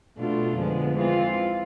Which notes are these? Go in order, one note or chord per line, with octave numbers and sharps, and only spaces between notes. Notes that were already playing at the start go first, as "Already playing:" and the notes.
B2 A3 D4 F4
F2 D3 F3 G#3 B3
E3 G#3 C4 F4